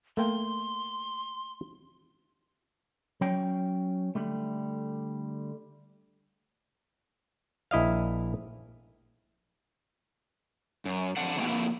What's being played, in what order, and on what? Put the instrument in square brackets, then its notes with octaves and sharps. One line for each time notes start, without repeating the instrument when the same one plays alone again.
[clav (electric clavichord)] A3 A#3 G5 [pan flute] C6
[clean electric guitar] F#3 C#4 G5
D3 G3 A3
[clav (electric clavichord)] A#1 E4 D#5 F5
[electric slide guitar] F#2
F2 D4 F#5
F2 B2 G#3 A#3 G5
F2 A#3 E4